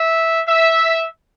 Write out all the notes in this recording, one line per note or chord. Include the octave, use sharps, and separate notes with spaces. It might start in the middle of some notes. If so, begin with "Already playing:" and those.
Already playing: E5
E5